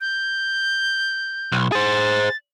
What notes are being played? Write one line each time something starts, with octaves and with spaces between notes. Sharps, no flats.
G6
B1
G#4 C5 A6